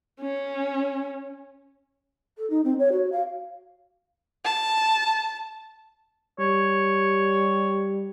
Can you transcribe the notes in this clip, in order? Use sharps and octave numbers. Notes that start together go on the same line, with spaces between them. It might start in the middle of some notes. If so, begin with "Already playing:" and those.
C#4
A4
D#4
C4
C#5
F#4
F5
A5
G3 C#5